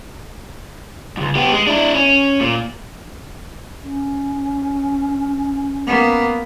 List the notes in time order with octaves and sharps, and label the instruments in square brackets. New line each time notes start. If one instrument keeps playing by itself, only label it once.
[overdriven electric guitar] C#2 F#2
B3 G4
G#3
D4 E4
C#4
A#2
[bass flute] C#4
[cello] A#3 B3